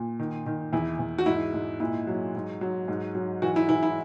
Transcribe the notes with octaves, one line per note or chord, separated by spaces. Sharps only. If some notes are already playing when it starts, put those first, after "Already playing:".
Already playing: A#2
D#3
D#3
E2 E4
E2
F#4
G#2 E4
G#2
A#2 E4
F#3
G#2
F#3
G#2
F#3
E3 F#4
E4
E3 E4
E4